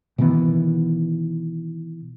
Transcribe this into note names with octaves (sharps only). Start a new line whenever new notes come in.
B2 D#3 E3 B3